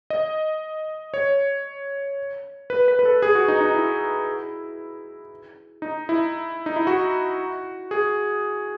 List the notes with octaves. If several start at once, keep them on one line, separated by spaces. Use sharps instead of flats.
D#5
C#5
B4
B4
B4
A4
G#4
F#4
D#4
D#4
E4
D#4
E4
D#4
E4
F#4
G#4